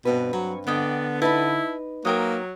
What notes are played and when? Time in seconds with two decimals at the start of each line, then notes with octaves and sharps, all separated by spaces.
0.05 G2 B2 C4 B4
0.33 F#3 C#5
0.67 D3 B3 D5 D#5 G5
1.22 D#4 E4 B4 A5 B5
2.05 F#3 A#3 A#4 G5 D#6